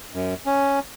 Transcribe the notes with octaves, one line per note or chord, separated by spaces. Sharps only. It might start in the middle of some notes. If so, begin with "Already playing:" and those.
F#2
C#4